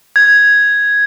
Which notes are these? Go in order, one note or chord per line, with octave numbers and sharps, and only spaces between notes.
G#6